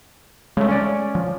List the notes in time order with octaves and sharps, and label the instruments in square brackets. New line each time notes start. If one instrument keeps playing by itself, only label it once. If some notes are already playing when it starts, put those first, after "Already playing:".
[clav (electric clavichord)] C#3 A3 [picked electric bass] G#3
[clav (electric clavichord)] C#4 D5
[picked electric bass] F3